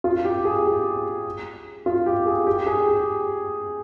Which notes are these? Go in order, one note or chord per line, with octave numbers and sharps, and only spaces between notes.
F4
G4
G#4
G4
F4
G4
G#4
G4
G#4
G4